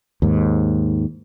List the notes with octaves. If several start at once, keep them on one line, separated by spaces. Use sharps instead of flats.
D#2 G#2